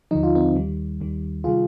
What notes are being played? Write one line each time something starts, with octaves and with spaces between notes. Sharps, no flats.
D#2 D3 F3 D#4
F4
C4 D#4
D#2 D#3 G3
D#2 D#3 G3
C3 D#3 G3 F4 G#4